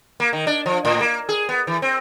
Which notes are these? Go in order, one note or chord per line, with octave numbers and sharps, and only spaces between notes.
A#3
D#3
D4
F3
A2
A#3
G#4
B3
E3
C4